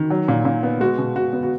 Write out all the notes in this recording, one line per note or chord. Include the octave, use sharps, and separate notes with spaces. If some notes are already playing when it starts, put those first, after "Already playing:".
Already playing: D#3
F#3
A#2
A#2
B3
G#3 F#4
B2
B2 F#4
B3
F#4